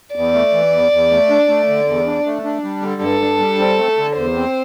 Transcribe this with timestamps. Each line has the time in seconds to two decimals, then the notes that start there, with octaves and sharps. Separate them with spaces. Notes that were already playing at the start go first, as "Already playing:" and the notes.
0.15 E2 D5
0.34 A3
0.53 E3
0.72 E2
0.92 E2
1.11 A3
1.30 D4
1.48 A3
1.68 D3
1.88 E2
2.06 D4
2.26 A3
2.44 D4
2.64 G3
2.82 D3
3.02 G2 A4
3.21 D4
3.40 G3
3.59 C4
3.78 A3
3.98 D3
4.16 E2 C5
4.36 C4